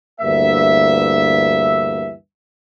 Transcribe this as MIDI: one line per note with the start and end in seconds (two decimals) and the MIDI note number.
0.21 2.11 38
0.21 2.11 43
0.21 2.11 52
0.21 2.11 58
0.21 2.11 76